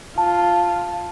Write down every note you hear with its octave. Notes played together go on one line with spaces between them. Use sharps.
F4 A5